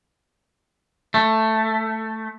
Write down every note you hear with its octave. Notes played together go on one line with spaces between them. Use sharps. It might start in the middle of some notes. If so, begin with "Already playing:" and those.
A3